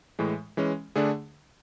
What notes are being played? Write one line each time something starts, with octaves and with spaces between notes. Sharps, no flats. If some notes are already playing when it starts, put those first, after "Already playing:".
A2 E3 G#3
E3 G#3 C#4
D3 A3 D4 G#4